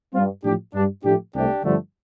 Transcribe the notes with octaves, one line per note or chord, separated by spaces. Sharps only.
G2 G3 C4 F4
A2 F3 A3 D4 G4
G2 G3 D4
A2 F3 A3 D4 G4
C2 C3 A3 D4 G4
G2 D3 F3 A3